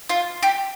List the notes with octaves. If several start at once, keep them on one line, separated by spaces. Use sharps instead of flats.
F4
G4